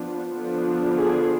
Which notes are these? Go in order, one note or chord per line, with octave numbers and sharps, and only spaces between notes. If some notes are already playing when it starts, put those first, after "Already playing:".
Already playing: F3 B3 D4
D3 F3 B3 D4
G#4